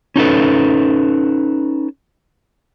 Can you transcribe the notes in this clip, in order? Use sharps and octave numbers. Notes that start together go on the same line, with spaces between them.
C#4 D#4 A4 B4